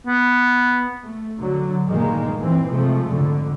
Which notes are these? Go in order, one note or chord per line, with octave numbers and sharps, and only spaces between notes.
B3
A3
D3 F#3
G2 A#2 D#3 G#3 A#3
A2 E3 C4
C3 F3 G#3 A3
F2 G#2 D3